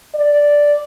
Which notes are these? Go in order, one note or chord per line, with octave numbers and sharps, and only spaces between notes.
D5